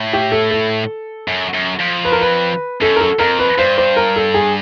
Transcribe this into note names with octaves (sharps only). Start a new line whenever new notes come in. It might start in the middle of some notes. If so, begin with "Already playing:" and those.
Already playing: A2
G4
A4
A4
F#2
F#2
F2
B4
A#4
B4
F#2 A4
A#4
A4
F2 A#4
B4
G2 C5
C5
A#4
A4
G#4